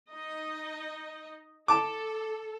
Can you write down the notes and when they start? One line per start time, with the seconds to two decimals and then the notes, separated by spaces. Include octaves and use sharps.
0.11 D#4 D#5
1.68 A4 A5 D6